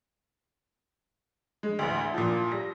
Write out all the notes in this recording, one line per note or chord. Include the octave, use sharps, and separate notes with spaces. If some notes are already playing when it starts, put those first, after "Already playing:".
G#3
A1 D2
A#2 F3
G3 A#6